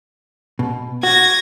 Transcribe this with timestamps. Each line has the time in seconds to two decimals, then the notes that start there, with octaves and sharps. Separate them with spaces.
0.59 B2
1.03 F#4 G#6 A#6